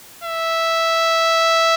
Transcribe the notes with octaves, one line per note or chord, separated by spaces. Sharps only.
E5